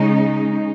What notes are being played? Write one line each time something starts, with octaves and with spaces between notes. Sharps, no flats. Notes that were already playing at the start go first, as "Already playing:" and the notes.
Already playing: C#3 G#3 D#4